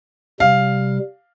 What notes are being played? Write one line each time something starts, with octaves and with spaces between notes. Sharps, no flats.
C3 G3 F5